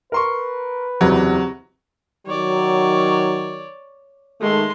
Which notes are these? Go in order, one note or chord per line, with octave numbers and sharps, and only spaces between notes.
A#4 B4 C6 C#6
F#1 E2 C3 F#3
D#3 F#3 C#5 D5
D#3 G#3 A3 C6